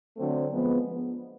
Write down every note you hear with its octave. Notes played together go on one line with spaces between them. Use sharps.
D3 F#3 A3 C4
F3 G#3 B3